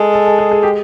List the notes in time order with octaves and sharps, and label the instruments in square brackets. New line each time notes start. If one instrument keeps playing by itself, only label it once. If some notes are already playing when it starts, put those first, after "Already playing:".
Already playing: [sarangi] G#3 [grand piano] A4
[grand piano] A4
A4
G#4
G#4
G4